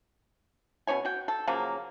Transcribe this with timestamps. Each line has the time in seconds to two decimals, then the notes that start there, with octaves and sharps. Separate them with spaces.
0.87 B2 C#4 C#5 G#5
1.05 F#4 G5
1.28 A4
1.47 C#3 F3 F#3 A#3